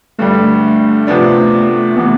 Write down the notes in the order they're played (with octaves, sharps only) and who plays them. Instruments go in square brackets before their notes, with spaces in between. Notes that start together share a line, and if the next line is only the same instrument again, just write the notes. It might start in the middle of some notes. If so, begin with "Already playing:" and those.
[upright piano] G2 D3 G3 [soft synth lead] A3
[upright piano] C3 F3 B3 D4
[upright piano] C3 E3 [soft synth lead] B3